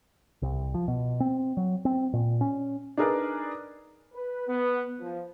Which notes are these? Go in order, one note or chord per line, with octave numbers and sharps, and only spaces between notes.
C2
F3
B2
C4
F#3
C4
A#2
C#4
D4 D#4 G#4 A#4 B4 D5
B4
B3
F3